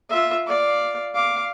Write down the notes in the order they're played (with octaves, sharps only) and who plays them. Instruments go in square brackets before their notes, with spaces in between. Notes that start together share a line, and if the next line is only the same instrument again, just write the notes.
[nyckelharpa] F4 E5
D5 F5
F5 D6